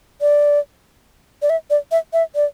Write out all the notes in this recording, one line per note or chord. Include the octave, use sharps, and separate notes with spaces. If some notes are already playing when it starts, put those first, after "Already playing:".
D5
D5
E5
D5
E5
E5
D5